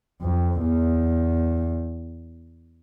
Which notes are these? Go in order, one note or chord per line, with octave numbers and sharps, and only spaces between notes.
F2
E2